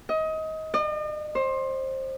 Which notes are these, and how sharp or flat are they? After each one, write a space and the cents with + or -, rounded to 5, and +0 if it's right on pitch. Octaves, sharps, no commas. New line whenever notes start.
D#5 +25
D#5 -45
C5 +20